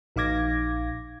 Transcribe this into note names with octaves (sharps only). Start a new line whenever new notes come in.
A#1 D#4 F5 D6 G#6 A#6